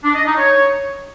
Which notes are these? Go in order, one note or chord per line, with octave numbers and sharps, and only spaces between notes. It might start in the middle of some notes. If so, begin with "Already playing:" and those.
D4
D#5
D#4
C#5